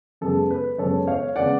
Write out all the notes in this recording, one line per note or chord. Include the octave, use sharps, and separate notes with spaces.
F#2 C#3 G#3 B3 A4
B4
F#2 C#3 G#3 B3 A4 C#5
C#5 F5
C#3 G#3 B3 D5 F#5